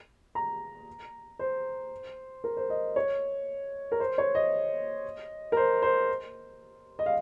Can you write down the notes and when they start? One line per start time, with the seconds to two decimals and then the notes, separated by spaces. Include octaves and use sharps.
0.35 A#5
1.39 C5
2.44 A#4
2.57 C5
2.70 D#5
2.96 C#5
3.92 A#4
4.00 C5
4.18 C#5
4.35 D#5
5.52 A#4
5.57 C5
5.82 C5
6.99 D#5
7.06 F5